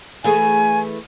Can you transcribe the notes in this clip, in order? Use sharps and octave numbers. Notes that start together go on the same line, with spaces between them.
E3 A3 G#4 G#5